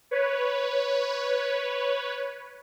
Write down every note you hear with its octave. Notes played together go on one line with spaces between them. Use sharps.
B4 C#5